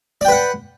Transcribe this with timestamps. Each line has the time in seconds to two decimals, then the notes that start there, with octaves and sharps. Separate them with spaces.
0.21 D5
0.25 G5
0.28 B4
0.32 F#5